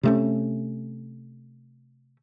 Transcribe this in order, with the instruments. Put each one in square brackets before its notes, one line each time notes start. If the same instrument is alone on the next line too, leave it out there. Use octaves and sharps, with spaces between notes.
[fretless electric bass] C3 A3 C#4